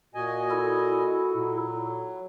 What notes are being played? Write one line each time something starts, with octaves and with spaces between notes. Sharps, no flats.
A#2 F#4 D#5 G#5
E4 A4
A#2 F#3